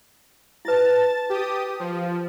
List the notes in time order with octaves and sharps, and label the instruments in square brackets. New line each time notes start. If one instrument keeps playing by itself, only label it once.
[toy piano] E4 B4 [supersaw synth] A5 A6
[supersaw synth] G4 D#6
F3